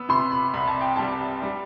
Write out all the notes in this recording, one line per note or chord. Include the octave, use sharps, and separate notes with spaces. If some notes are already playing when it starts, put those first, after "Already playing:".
Already playing: B3 E6
C3 C6
B5
C2 B5
A5
G5
G3 A5
G3